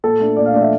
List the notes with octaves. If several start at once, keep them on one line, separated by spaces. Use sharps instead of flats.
A#2 A4
A3 D4
A#2 D5
F5
A3 D4 D5
E5